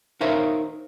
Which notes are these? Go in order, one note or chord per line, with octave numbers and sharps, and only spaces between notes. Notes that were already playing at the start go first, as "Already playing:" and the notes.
D#4 A#4 C5 C#5 E5 F5